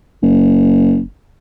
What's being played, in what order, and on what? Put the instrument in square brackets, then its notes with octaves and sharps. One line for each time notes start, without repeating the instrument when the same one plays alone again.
[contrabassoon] F#1